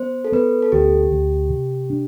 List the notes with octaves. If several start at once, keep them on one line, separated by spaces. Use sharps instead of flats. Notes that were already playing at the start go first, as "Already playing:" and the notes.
Already playing: B3 C5
A4
B3 B4
A4
D2 G4
D2
C3
D4